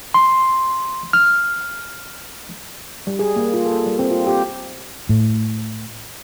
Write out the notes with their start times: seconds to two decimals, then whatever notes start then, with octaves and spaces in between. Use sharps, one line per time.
0.14 C6
1.13 F6
3.07 G3
3.19 G#4
3.36 A#3
3.53 F4
3.66 A4
3.86 G3
3.99 C4
4.11 F4
4.27 G4
5.09 A2